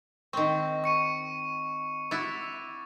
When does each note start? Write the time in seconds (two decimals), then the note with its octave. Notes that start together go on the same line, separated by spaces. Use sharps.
0.33 D#3 C4 C#6
0.84 C#6 C#7 D#7
2.11 E4 F#4 D6 A6